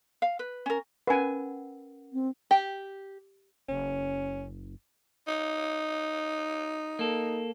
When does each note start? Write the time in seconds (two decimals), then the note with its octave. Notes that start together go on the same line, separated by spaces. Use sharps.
0.22 F5
0.39 B4
0.66 C#4 A#4
1.07 C#4 A#4 B4 F#5 G#5
2.13 C4
2.51 G4
3.69 F#1 C#4
5.28 D#4
6.99 A#3 A4